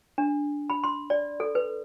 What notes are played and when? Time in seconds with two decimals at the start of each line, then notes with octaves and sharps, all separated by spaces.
0.18 D4
0.70 B5
0.84 C6
1.10 D5
1.40 A4
1.55 B4